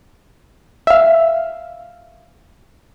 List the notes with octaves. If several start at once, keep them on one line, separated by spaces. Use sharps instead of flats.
E5 F5